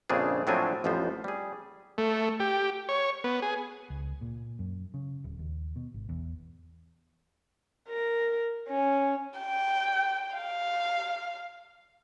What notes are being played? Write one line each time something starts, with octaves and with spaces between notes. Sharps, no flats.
A#1 F2 C#3 C4 D4 G#4
A2 F3 F#3 C4 D4 G#5
A1 F2 F3 B3 C5
G3 G#4
A3
G4
C#5
B3
G#4
C#2
A#2
F#2
C#3
D1
D#2
B2
G#1
E2
A#4
C#4
G5
F5